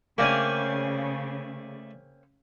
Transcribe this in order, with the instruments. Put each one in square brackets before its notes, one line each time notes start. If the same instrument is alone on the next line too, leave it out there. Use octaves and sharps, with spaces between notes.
[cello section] C#3 [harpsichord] A3 D5 G#5 [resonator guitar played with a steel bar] A#3 C4 C#4